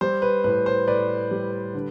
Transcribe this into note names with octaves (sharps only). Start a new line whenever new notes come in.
G3 C5
B4
A2 B4
C5
A2 B4 D5
G3
D3